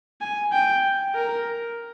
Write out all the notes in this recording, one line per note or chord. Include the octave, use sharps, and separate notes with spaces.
G#5
G5
A#4